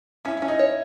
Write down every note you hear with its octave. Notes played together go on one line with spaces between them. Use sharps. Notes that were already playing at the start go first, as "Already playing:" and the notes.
C#4 E4
E4
C#4
D#4
C#5